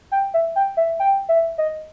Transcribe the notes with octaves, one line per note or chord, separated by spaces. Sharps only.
G5
E5
G5
E5
G5
E5
D#5